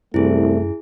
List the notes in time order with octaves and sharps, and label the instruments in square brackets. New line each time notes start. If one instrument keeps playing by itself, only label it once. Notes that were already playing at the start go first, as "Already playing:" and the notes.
[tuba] C2 [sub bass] F#2 [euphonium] A3 [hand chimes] E4 G#4